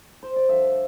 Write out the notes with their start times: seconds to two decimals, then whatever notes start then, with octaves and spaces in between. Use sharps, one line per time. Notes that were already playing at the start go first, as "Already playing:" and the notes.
0.23 C5
0.36 D5
0.49 G2 D3 F3 E5